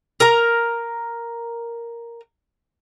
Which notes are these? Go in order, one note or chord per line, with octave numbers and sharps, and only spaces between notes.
A#4 A#5